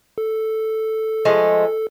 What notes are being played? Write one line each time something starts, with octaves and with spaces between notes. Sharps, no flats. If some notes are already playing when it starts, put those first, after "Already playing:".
A4
F3 G#3 A3